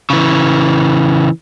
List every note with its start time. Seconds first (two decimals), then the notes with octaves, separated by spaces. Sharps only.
0.10 C#3 E3